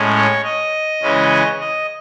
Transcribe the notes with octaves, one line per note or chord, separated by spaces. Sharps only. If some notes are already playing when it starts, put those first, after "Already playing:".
Already playing: A2 G#3 C#4
C#5
D#5
C#3 E3 G#3 C#4
D#5